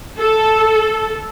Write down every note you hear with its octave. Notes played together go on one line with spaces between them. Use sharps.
A4